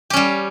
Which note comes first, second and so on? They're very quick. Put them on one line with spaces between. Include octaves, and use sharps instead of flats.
G4 C#4 G3